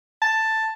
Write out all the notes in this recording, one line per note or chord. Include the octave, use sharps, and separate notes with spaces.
A5